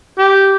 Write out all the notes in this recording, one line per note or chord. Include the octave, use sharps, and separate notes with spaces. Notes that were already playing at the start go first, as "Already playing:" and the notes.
G4